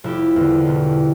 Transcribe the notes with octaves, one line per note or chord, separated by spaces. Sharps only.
F1 E4 G4
E2 D3
E1